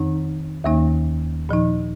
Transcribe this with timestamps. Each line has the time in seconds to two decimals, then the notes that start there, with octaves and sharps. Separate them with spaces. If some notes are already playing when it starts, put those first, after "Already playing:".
Already playing: F2 D#3 C4 D#4
0.64 D#2 D#3 A#3 D#4
1.49 A#2 F3 D#4